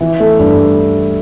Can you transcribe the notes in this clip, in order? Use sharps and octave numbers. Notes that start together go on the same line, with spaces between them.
E3
A3
G2